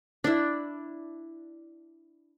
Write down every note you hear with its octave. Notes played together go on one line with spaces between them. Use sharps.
D4 E4